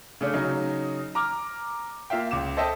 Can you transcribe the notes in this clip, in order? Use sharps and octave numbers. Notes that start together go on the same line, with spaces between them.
C#3 A3 D4
C#3 F#3 D#4
A#5 D6 F6
A#3 F4 E5 F5 G5
C#2 D6 E7
A4 C5 D#5 E5 G5 A5